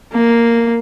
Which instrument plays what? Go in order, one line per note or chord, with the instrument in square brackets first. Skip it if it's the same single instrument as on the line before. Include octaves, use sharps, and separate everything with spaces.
[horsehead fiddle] A#3